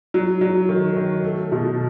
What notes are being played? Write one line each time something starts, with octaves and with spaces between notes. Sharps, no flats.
F#3
F#3
D#3
D#3
A3
B2